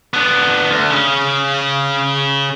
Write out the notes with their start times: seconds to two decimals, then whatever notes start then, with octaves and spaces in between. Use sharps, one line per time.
0.14 B3 D4
0.70 D2
0.90 C#3 C#4